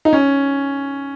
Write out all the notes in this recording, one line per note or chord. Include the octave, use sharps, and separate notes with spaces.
D#4
C#4